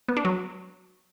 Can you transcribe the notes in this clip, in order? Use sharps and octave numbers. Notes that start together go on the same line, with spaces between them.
B3
D4
F#3